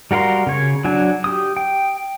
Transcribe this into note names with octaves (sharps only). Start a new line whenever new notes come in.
G3 F#4 A#4 F5 C6
C#3 C#5
F#3 D4 G#5
G4 D#6
G5